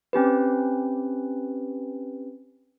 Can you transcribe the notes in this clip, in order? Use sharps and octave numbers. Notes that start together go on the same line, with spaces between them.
C4 C#4 G4 B4